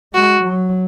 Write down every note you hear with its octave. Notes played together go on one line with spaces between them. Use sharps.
G#3 F#4
F#3